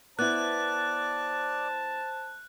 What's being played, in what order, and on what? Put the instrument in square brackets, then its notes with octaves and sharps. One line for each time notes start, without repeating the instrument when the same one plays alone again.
[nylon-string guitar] B3 E4 [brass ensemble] C5 A5 [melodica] D5 [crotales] F#6